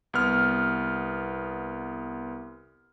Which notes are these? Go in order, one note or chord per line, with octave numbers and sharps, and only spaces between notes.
C2 B3 F6